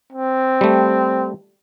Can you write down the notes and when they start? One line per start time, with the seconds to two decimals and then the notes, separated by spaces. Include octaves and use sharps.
0.13 C4
0.61 G3 A3